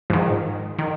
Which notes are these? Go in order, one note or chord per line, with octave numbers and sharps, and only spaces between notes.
G#2 D#3 F3
D#3